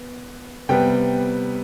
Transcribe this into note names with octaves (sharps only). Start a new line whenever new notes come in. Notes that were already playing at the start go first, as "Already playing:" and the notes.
Already playing: B3
C3 G3 B3 G5